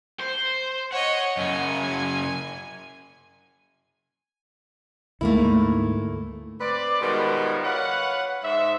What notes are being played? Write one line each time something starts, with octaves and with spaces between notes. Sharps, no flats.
C5
C#5 D#5 F#5
F#2 C#3 G#5
D2 G#2 A3 A#3 E4
C4 B4 D5
B2 D#3 F3 G3 G#3
B4 C#5 F5 F#5
G#2 G#3 E5